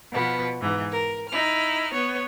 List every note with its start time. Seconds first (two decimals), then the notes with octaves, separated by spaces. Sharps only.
0.12 B2 F3 B3
0.60 G#2 E3
0.91 A#4
1.28 D#4 E4 F6
1.92 B3 C#5